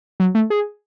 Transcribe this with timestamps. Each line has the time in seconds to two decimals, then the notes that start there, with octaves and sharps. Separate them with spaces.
0.20 F#3
0.35 A3
0.50 G#4